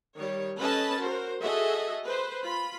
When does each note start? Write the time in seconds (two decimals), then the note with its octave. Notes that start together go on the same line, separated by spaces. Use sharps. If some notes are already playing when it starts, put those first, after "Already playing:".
0.17 D#3 G3 C#5
0.59 C#4 A4 B4 D#5 A5 B5
0.99 F#4 A#4 C5
1.41 F#4 G#4 A4 D#5 E5
2.06 B4 C5
2.42 F4 B5